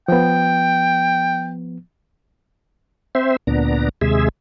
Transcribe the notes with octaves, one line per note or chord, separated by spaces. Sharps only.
F3 B3 G5
C4 C5 E5
D2 A#2 B3 D4 A#5
D#2 C3 G#3 G#4 E5